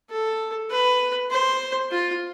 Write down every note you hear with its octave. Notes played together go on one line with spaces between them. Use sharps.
A4
B4
C5
F4